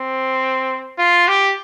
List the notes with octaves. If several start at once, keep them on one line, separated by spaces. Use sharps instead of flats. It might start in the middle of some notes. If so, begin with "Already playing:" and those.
Already playing: C4
F4
G4